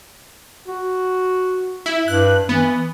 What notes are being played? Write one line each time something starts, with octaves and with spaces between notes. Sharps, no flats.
F#4
E4
G2 F#6
E3 B3